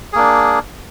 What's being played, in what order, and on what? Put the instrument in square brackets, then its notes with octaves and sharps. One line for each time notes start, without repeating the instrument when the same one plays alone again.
[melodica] G#4
A#3
D4